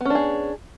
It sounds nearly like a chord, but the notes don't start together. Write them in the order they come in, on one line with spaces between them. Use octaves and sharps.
B3 C#4 D4 G#4